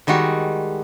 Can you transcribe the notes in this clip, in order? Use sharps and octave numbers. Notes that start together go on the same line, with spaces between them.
D#3 G3 G#3 F#4